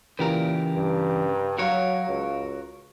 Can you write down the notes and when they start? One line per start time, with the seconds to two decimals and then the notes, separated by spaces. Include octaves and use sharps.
0.19 A#2 C#3 E3 G4 A#4
0.75 G2
1.58 F#3 F#4 A#4 C#5 F5 C#7
2.08 C#2